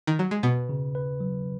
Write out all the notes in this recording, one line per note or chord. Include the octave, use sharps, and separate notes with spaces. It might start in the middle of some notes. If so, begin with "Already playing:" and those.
D#3
F#3
G#3
B2 B3 B4
C#3
B4
F#3